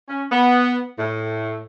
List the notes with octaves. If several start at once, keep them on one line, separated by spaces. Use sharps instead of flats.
C#4
B3
A2